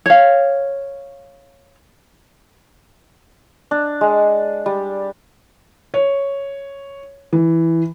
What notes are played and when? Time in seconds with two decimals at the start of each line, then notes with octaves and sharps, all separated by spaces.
0.06 C#5 F5
3.71 D4
4.01 G#3
4.66 G3
5.94 C#5
7.33 E3